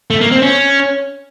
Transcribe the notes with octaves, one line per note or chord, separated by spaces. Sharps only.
A3
A#3
C4
C#4